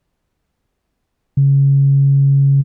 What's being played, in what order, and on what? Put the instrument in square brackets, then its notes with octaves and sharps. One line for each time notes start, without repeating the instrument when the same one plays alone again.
[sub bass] C#3